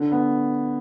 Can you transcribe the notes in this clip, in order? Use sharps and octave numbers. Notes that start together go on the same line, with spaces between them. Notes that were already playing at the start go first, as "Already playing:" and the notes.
Already playing: D3
B3